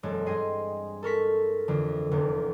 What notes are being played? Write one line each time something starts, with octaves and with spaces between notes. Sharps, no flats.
E1 F#2 G#3 C4 A4
G2 G#4 D#5 G5 C6
A4 A#4 C#6 B6
F2 D3 E3
F1 E2 D3